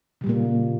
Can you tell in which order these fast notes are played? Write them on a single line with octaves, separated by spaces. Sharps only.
C#3 G3 A#2 A#3